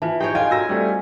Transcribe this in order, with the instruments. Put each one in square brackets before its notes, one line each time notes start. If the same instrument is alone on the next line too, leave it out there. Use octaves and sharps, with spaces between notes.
[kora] E3 [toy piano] F4 B4 A5
[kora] D#4 G#4 C#5 [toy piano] G4 [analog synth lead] G5
[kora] F4 [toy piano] A4 C#5 D#5 [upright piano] G5 [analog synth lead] G#5
[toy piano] F#4 A#4 A#5 [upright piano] E6 A#6
[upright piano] G3 A3 C4 [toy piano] A4